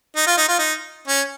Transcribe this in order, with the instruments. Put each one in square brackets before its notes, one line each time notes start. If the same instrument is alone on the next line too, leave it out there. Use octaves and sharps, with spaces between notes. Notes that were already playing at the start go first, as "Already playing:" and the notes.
[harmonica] D#4
F4
D#4
F4
D#4
C#4